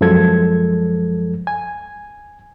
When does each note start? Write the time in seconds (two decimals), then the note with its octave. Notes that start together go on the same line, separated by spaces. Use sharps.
0.01 F#2 F3 G#3 A4 G#6
1.47 G#5